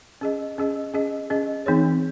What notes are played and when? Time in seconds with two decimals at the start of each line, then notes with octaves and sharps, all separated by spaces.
0.21 C#4 G#4 D#5
0.58 C#4 G#4 D#5
0.94 C#4 G#4 D#5
1.30 C#4 G#4 D#5
1.66 E3 C4 D#4 G#4 C#5